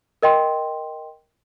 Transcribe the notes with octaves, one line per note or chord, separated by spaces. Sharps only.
A#4 D#5 G5 C6